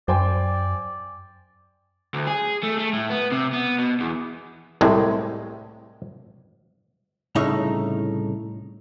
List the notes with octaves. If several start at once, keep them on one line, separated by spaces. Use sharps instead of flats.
F#2 C5 D5 G5 G#5
D2
G#4
A3
A3
A2
B3
C3
B3
B2
E2
C2 A2 C3 G#3
C2 A2 C#3 D#4 C#5 E5